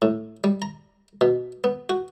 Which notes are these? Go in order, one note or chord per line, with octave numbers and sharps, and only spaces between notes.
A2
G3
A#5
B2
B3
F#4